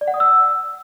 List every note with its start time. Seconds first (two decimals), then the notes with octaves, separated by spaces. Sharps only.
0.01 D5
0.08 F#5
0.14 D#6
0.20 E6